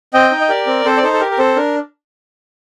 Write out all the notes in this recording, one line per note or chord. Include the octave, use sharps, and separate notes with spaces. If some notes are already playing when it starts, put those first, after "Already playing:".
C4 D#5 G5
D#4
D#5
G4 A#4 D5
C4
C4 A4 C5
D5
D#4 A4 C5
A4
G4 A#4
A#4
C4 A4 C5
D4 A#4